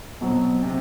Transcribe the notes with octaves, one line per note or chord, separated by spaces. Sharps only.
B2 F#3 C4
C3